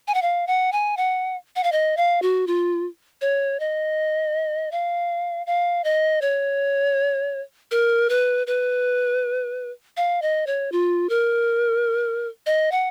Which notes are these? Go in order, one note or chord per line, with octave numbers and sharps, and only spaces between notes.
G#5
F#5
F5
F#5
G#5
F#5
F#5
F5
D#5
F5
F#4
F4
C#5
D#5
F5
F5
D#5
C#5
A#4
B4
B4
F5
D#5
C#5
F4
A#4
D#5
F#5